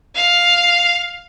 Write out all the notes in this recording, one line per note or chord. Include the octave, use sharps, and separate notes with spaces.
F5